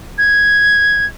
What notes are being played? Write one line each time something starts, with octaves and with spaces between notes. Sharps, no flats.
G#6